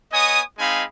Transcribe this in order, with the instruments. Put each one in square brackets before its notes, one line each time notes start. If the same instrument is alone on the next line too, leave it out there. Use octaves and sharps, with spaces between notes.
[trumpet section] B3 C#5 D#5 G#5 D#6
G#3 C4 D#4 F5 G#5 B5